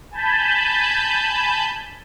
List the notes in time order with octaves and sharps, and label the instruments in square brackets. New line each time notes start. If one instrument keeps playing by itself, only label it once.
[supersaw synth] G#5 A5 B5 G6